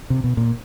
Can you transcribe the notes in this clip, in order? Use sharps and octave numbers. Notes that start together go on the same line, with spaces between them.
C3
B2
A#2